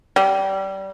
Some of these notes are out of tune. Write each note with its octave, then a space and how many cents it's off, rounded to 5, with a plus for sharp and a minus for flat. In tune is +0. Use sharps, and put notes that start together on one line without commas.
G3 -20